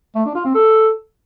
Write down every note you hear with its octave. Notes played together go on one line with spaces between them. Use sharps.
A3
D4
F4
C4
A4